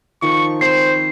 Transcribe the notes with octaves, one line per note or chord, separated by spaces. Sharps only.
D#3 F3 C#6
C4 C5 B5 C#6 C7